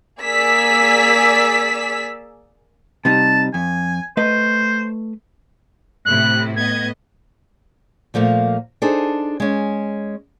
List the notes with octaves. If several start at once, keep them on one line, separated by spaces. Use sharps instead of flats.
A#3 G#4 D5 G#5 E6 B6
C3 G3 D#4 A5
F2 G#5
A3 B4 C5 D#5
A2 C3 E4 F#6
A2 B3 D#5 G#6
A#2 F3 A3 A#3
D4 D#4 G#4 A4 C5
G#3 C#4